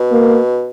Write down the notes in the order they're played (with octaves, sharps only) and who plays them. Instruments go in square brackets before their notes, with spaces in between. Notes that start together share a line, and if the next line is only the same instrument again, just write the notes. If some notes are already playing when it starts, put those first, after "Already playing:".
Already playing: [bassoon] B2
[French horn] A#3